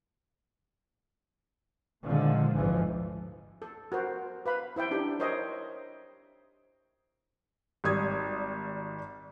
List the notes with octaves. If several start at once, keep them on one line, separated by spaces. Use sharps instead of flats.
A#2 D3 D#3 F3 G#3
G#1 D2 G#2 E3 F3
A4
F#4 A#4 C5
B4 F5 B5
E4 C5 E5 G5
D4 D#4 G4 A4
A#4 C5 C#5 D#5 E5 G5
G#1 G3 D#6 G#6